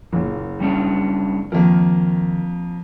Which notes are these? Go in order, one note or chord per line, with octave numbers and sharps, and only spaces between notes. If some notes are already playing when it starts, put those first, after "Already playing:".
F#1 A#2
G3 C#4 D4
F2 D#3 A#3 A#4